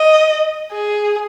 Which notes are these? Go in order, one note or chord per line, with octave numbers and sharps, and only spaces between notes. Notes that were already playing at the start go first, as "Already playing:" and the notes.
Already playing: D#5
G#4